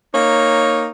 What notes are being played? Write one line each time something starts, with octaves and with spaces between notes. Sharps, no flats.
A#3 D#4 C#5